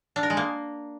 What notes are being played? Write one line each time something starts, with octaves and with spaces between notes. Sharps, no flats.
D4
A#4
G#3
A#3